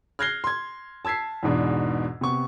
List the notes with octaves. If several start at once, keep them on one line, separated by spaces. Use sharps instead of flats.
F6 F#6 G#6 A#6 C7 G7
C6 G#6
A5 E6 G#6 B6 C7
E2 G#2 B2 D4
C3 B3 C#6